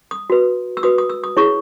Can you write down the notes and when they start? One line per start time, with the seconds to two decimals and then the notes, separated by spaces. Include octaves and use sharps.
0.11 D#6
0.30 F#4 B4
0.77 E6
0.83 F#4 B4 D#6
0.98 D#6
1.10 E6
1.24 D#6
1.37 E4 G#4 C#5 C#6